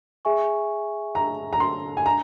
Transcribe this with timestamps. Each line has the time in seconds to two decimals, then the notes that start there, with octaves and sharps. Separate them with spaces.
0.25 G#4 E5 G#5 C#6
1.15 A#5
1.53 A#5
1.60 C6
1.97 G#5
2.06 A#5